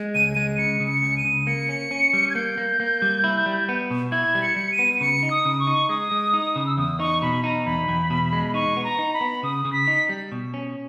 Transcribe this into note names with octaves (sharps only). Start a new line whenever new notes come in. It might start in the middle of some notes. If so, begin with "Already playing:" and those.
Already playing: G#3
C#2 D#7
G#3 D#7
C#3 C#7
C#3
C#7
C#2
D#7
C#3
A#3 C#7
C#4
C#4
G3
G#6
A#3 G6
A#3
A#3
G3
E4
G3
B3
B2
E4 G#6
G3
C#7
G3
D#7
B3
D#7
C#3 C#7
D#4
D#6
C#3
C#6
D#4
G#3 D#6
G#3
D#4
C#3
E6
E2 D#6
D#4 C#6
B2 B5
D#4 A#5
E2 B5
E2
B2
G#3
D#4 C#6
B3
A#5
D#4
B5
B3
C#3 D#6
C#3
B6
D#4
G3
B2
C#4